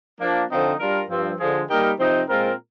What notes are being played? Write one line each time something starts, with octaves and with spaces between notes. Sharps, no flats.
F3 A#3 D4
D3 F3 C4 D#4
G3 D4 F4 A#4
G2 F3 C4
D3 F3 G#3
G3 A#3 D#4 G4 A#4
C3 F3 C4 D#4
A#2 G#3 C4 F4 A#4